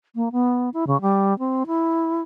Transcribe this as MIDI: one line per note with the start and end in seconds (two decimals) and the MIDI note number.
0.15 0.29 58
0.32 0.70 59
0.74 0.84 64
0.87 1.00 49
1.01 1.37 55
1.39 1.63 60
1.67 2.22 64